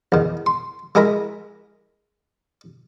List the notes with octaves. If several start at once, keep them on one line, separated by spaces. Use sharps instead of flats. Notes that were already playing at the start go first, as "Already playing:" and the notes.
E2 D#3
C6
G#3 E4 G#4 A#4 A#5 B5